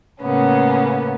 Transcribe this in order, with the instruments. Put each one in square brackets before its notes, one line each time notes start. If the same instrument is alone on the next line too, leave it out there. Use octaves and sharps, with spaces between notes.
[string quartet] A2 C#3 A#3 B3 C#4